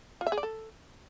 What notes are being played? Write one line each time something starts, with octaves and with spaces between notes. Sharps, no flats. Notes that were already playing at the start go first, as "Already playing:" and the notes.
F4
E5
G#4
D5
A4